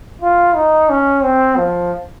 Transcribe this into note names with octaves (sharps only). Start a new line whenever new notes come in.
F4
D#4
C#4
C4
F3